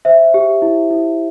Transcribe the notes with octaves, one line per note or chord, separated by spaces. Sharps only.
C5 E5
G4
E4
E4